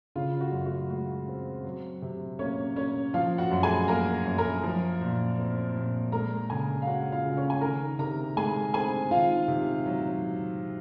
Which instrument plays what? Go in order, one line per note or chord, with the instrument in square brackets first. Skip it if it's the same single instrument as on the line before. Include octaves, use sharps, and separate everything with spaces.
[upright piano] C#3 F4
F#4
F#2
F#4
G#3 F#4
C4
F#3
C3
A#3 C#4 C#5
C#4 C#5
F3 F4 F5
F#4 F#5
F#2
G#4 G#5
A#3 A#4 A#5
F#2
A#4 A#5
F3
A#2
C4
A#2
G#3 A#4 A#5
C#3 G#4 G#5
F5
C#4 F#4 F#5
F4 F5
C#3
C#4 C#5
G#5
D#3 A#4 A#5
C3 A#4 A#5
G#3 G#4 G#5
C4 G#4 G#5
D#3 F4 F5
C3
F#3